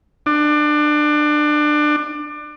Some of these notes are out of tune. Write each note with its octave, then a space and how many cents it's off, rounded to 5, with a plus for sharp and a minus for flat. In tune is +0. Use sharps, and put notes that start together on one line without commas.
D4 +25